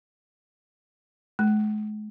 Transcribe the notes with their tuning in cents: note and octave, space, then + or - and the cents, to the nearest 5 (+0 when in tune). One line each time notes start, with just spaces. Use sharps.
G#3 +40